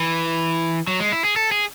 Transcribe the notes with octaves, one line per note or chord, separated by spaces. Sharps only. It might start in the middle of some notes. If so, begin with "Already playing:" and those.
Already playing: E3
F#3
G#3
E4
G#4
A4
G#4